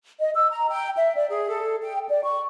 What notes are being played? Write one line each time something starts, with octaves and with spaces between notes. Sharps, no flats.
D#5
E6
A#5
G5
E5
D5
G#4
A4
G5
D5
C#6